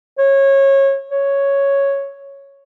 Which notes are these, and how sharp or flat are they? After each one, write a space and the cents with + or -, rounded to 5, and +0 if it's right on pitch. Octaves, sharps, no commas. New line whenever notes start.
C#5 -20
C#5 +0